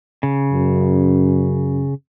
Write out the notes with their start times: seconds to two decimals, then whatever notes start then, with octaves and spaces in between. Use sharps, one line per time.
0.23 C#3
0.53 F#2